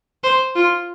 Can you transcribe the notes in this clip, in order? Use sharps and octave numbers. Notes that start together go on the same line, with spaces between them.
C5
F4